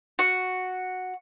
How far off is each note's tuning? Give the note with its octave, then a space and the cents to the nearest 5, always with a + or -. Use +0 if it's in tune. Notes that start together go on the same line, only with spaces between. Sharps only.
F#4 -5